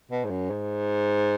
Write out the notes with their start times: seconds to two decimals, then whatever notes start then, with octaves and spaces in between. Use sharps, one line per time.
0.11 B2
0.25 G#2
0.30 F#2
0.50 G#2